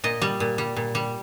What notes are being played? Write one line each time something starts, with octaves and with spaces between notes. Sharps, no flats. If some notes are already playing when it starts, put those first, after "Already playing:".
A#2 D#5
G3
A#2
G3
A#2
G3